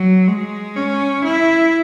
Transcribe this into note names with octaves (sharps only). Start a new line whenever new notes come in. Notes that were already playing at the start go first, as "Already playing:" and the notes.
Already playing: F#3
G#3
C#4
E4